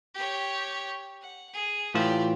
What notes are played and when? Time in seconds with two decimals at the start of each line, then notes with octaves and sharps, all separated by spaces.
0.14 G4 C#5
1.21 F#5
1.53 G#4
1.95 A2 E3 F4 G4 D5